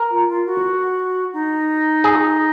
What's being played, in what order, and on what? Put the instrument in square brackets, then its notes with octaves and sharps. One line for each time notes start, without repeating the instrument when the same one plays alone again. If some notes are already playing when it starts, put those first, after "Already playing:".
Already playing: [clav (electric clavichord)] A#4
[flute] F4
F4
F#4
D#4
[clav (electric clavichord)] G#4